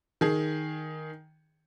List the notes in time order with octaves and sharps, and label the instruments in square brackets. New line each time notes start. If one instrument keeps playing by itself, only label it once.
[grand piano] D#3 G#4